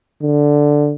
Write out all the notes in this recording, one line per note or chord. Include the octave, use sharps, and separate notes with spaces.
D3